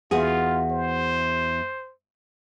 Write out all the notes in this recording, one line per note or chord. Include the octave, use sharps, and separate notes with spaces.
E2 F4 F#4 G#4
C5